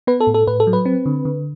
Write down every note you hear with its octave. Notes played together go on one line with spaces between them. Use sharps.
B3 B4
A4
A2
A4
A2 B4
A4
F#3
B4
C4
D3
D3